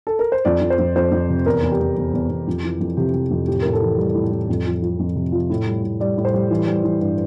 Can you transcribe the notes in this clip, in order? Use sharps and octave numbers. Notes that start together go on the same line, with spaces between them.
A4
A#4
C5
F2 D5
F2
C5
F2
F2 C5
F2
C3
E2 A#4
E2
G4
E2
E2
E2
E2
F2
E3
F2
C3 G4
C3
F2
A2 G4
A2 A#4
A4
E3
G3
A2
A2
F2
F3
F3
F2
C3
F3
A2
G3
A2
G3 D5
A2
C5
G3
E3
G3
E3
G2